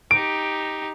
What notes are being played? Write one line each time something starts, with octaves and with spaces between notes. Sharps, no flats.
D#4 G4 D7